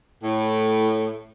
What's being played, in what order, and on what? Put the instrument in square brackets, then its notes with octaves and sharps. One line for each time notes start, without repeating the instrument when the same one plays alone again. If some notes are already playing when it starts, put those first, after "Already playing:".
[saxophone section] A2